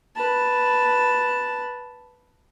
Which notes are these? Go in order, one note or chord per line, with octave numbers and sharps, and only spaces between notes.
B4 A5